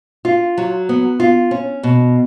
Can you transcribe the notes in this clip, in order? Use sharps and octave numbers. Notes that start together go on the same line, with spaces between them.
F4
F#3
B3
F4
C#4
B2